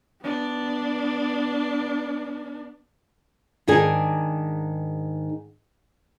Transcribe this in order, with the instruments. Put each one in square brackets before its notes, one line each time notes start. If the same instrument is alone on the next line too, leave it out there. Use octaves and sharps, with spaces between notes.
[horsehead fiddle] B3 D4
[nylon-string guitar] G#2 D#3 D4 G#4 G#5